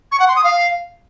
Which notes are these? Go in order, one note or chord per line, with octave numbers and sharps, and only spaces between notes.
C#6
F#5
C6
D#6
F5